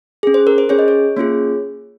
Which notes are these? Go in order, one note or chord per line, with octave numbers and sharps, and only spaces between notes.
C#4 G#4
C5
A#4
C5
C#4 G#4 C#5
D#5
C#5
A#3 C#4 F4 G#4 C#5